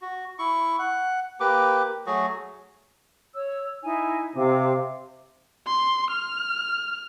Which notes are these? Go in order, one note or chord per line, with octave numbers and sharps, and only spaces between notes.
F#4
E4 C#6
F#5
A#3 G4 B4 D6
F#3 A3 F#4 G#4
C#5 E6
D#4 E4 G#5
C3 F5 D6
C6
F6